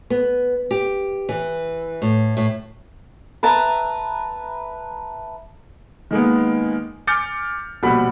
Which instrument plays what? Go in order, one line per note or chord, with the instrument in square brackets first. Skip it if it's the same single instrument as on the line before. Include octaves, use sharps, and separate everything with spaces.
[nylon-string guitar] B3
G4
E3
A2
A2
[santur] B4 E5 A5 A#5
[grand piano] D#3 G#3 A#3 B3
G#5 D6 F6 G6 A6 C#7
A#1 B2 G3 F#4 B5 B6